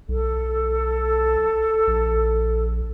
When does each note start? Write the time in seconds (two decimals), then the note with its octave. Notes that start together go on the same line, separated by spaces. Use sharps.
0.09 B1 A4
1.87 A#1